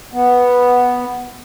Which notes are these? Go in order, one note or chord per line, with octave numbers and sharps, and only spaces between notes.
B3